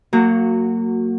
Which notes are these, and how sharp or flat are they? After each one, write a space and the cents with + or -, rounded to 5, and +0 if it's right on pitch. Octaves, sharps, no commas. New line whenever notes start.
F#3 -10 A#3 -30 F#4 +0